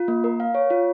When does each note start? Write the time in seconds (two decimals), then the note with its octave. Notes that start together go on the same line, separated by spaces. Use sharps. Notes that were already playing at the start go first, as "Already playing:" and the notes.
Already playing: F4
0.08 A#3
0.24 A#4
0.40 F5
0.55 C#5
0.70 F4